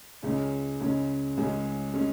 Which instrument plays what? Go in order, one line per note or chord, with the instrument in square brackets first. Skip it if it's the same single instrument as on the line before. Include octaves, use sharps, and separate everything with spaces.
[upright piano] C#2 C#3 G#3 C#4
C#2 C#3 G#3 C#4
C#2 C#3 G#3 C#4
C#3 G#3 C#4